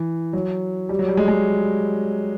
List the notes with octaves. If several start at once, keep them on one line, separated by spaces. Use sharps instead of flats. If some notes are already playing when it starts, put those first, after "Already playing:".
Already playing: E3
F#3
G3
F#3
G3
G#3
G#3